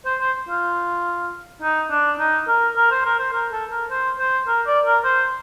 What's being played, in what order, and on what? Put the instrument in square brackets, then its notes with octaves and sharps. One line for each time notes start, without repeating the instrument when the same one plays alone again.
[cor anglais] C5
C5
F4
D#4
D4
D#4
A#4
A#4
C5
A#4
C5
A#4
A4
A#4
C5
C5
A#4
D5
A#4
C5